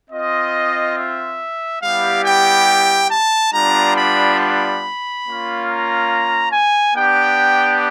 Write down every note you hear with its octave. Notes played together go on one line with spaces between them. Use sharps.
C4 F4 D#5
E5
G3 B3 E4 G4 F5
G5
A5
G3 B3 D4 F4 A#5
B5
B5
A#3 C#4 F4
A#5
G#5
B3 D4 G4 G5